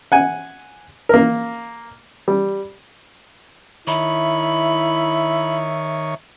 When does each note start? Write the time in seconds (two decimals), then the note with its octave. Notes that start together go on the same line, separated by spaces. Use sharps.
0.12 F#5 G#5
1.09 A#3 A#4
2.28 G3
3.87 D#3 E4 C#5 E5 B5